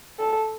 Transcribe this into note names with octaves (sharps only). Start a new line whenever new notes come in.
A4